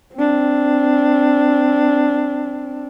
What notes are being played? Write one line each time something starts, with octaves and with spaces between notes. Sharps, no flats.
C4 D4